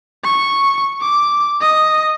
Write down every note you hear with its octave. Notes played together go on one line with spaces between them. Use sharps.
C#6
D6
D#5